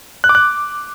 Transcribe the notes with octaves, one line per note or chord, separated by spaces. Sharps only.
F#6
D6
F#6